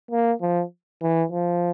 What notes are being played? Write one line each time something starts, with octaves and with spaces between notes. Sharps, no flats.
A#3
F3
E3
F3